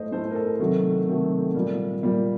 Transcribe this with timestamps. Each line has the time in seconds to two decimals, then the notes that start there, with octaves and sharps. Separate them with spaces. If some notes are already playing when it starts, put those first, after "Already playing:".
Already playing: A2 A3 C5 D#5
0.12 A2 A4 C5
0.16 A3
0.31 A#4
0.35 A4
0.59 C3 D#3 F#3 A3
1.08 C3 D#3 F#3 A3
1.54 A#2 G3 A#3
2.03 A#2 G3 A#3